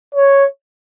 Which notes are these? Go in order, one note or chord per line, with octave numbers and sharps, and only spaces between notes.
C#5